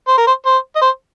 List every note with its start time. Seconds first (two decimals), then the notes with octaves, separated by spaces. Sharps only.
0.08 C5
0.17 A#4
0.27 C5
0.46 C5
0.76 D#5
0.82 C5